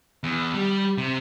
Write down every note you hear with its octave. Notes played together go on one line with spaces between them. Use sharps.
E2
G3
C3